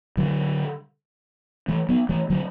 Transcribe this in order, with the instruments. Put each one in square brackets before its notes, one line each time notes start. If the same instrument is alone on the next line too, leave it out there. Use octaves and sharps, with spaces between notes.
[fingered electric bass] D3 F#3
E3 A3
F#3 B3
E3 A3
D3 F#3